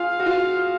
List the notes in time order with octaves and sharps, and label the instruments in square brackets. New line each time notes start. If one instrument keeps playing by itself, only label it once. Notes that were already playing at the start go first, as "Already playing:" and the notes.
Already playing: [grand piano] F4 G#4 [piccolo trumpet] F5
[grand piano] F#4
F4